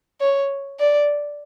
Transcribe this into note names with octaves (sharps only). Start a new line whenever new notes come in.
C#5
D5